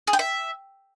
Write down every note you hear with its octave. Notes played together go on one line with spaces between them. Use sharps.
G#4
G5
E5